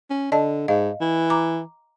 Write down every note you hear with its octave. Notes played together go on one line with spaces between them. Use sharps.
C#4
D3 D5 D#5 A5
G#2 D#5 F5
E3
A#5 D6